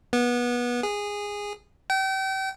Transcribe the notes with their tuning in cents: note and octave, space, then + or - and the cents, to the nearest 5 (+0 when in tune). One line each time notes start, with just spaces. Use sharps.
B3 -25
G#4 -15
G5 -35